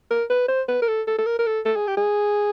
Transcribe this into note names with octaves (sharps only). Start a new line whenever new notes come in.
A#4
B4
C5
B4
A#4
A4
A4
A4
A#4
A#4
A4
A4
G#4
G4
G#4